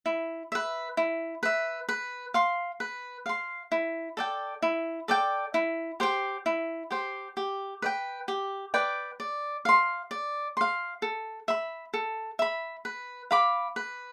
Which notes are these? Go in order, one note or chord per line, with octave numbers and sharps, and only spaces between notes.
E4
B4 E5
E4
B4 E5
B4
F5 C6
B4
F5 C6
E4
A4 D5 G5
E4
A4 D5 G5
E4
G4 C5 G5
E4
G4 C5 G5
G4
B4 D5 G5
G4
B4 D5 G5
D5
F5 C6
D5
F5 C6
A4
E5 B5
A4
E5 B5
B4
F5 B5 D6
B4